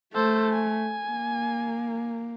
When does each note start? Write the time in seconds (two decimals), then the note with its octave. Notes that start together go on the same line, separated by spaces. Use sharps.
0.15 A3 A4 C5
0.52 G#5
1.06 A#3